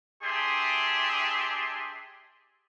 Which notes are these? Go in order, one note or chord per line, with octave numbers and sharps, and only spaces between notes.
D4 G4 G#4 E5 C6